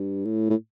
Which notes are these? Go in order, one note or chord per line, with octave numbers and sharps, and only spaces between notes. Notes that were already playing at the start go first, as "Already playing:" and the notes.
Already playing: G2
A2
A2